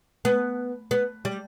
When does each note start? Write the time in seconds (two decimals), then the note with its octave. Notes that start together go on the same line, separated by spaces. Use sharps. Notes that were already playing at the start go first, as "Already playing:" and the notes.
0.25 B3
0.91 B3
1.25 G3